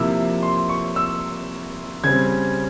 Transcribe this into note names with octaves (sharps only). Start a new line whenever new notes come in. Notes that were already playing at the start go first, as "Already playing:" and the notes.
Already playing: C3 F3 A#3 E4 E6
C6
C#6
E6
C#3 G3 C4 G#6